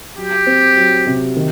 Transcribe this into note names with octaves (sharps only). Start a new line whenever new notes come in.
F#3 G4
C4
F#3
C3
D#3